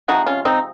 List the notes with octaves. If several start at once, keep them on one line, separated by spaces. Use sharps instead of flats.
C3 F3 G#3 D#4 F#4
C#4 F4
C4 D#4